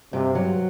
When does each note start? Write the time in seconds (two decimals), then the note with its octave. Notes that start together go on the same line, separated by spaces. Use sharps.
0.13 G2 C3
0.35 F#3